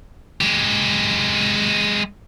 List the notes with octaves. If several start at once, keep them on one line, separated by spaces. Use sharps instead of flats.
G#3 G4